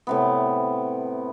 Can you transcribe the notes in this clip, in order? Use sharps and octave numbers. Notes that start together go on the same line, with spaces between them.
A2 C3 B3